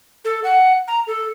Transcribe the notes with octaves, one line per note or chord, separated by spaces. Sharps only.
A4
F#5
A#5
A4